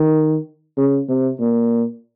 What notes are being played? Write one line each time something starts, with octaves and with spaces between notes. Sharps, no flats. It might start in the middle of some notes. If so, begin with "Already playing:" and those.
Already playing: D#3
C#3
C3
A#2